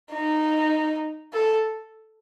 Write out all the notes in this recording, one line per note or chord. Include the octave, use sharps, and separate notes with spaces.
D#4
A4